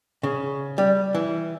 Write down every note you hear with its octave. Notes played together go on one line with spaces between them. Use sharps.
C#3
G3
E3